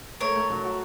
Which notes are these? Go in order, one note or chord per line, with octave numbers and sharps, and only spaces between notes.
A3 A#4 C#5
A3
F#3
F#4